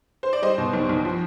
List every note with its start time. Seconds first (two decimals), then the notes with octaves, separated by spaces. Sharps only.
0.23 C5
0.33 D5
0.42 G3 C5 D#5
0.58 B2
0.73 B1
0.89 B1
1.05 F3